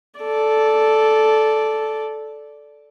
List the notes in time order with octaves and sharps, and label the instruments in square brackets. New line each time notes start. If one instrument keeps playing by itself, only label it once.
[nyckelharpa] A4 D5